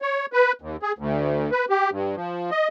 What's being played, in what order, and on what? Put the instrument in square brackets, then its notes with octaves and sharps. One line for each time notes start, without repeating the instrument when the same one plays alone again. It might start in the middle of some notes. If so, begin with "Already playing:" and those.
[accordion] C#5
B4
D#2
G#4
D2
B4
G4
G2
F3
D#5